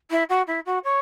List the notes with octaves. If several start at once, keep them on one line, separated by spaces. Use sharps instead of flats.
E4
F#4
E4
F#4
C#5